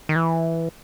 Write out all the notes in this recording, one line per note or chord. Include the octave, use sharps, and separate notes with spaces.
D#3
E3